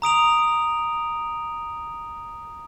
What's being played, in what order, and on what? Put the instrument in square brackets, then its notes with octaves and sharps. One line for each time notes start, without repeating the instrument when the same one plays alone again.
[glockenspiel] A#5 D#6 D7 F7